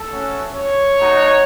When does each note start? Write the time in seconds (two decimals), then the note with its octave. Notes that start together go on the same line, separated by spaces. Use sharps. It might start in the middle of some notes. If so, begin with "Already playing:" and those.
Already playing: A4
0.11 A3 C#4 F#4
0.55 C#5
0.99 A3 D#4 F#4